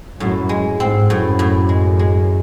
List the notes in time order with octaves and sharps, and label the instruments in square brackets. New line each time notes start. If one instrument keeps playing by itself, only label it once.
[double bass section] F#2 [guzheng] A2
[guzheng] G#3
[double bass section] G#2 [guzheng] C4
[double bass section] F#2 [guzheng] A2
[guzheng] A2
G#3
G#3